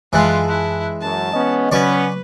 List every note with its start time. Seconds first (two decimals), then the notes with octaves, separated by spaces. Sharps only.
0.13 F#2 E3 G#3 E4 F4 A5 F#6
0.49 E4
1.01 F#2 A5
1.33 B3 C#4 D#5
1.72 C#3 F#3 B3 C#4 B4 D5 C#6